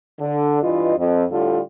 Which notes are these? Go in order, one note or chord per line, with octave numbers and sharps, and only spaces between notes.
D3
G2 E3 F4 D#5
F2
A2 D3 G3 F4 A4